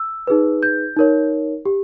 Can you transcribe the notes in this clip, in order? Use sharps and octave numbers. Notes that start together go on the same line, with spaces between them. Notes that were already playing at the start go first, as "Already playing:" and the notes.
Already playing: E6
D#4 G#4 B4
G6
D#4 A#4 C#5
G4